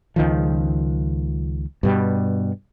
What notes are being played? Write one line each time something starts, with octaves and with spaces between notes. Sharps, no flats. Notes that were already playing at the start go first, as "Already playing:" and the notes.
C#2 D#3 F3
G2 B2 G3